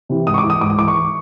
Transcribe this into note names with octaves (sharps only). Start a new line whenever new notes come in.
C3 E3
G#2 D#6
C#6
D6
E3
D#6
G#2 D6
D#6
E3 D6
C#6